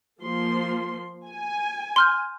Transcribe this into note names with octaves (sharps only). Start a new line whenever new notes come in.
F3 A#3 C6
G#5
C6 F6 G6